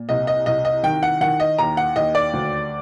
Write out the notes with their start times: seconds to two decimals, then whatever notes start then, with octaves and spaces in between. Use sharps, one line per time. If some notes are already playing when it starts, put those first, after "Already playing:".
Already playing: A#2
0.09 C2 D#5
0.27 D#5
0.46 C2 D#5
0.65 D#5
0.83 D#3 G5
1.03 F#5
1.21 D#3 F#5
1.40 D#5
1.58 D#2 A#5
1.77 F#5
1.96 D#2 D#5
2.15 D5
2.33 D2